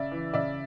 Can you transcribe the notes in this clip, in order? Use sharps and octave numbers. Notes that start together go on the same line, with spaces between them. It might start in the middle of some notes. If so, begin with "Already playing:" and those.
Already playing: C#3 D5 E5
E3
C#3 D5 E5